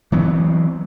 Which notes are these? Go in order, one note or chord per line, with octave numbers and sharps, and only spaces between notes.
E3 F#3 B3 C4